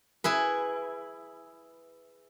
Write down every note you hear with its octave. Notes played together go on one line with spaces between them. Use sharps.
E4 G#4 B4